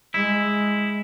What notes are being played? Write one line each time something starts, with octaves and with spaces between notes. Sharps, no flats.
G#3 E4